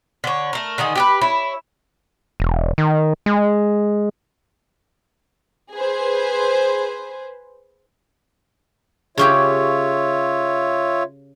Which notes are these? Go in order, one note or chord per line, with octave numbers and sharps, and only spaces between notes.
D3 C#5
A3 A#4
D3 D#3 D#4 G#4
G4 G#4 B4
E4 C#5
E1
D#3
G#3
G#4 B4 C5
C#3 C#4 F4 G4 C#5 E5